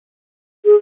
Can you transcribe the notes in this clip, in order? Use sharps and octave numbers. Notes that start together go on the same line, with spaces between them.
G#4